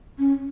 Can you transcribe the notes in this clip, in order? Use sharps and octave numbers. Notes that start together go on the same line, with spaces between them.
C#4